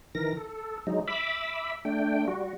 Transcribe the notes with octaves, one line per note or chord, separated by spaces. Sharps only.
D#3 E3 A#4 A#6
A4
F#3 G#3 D#4
E5 B5 D6 E6
A3 D4 G5
G3 F#4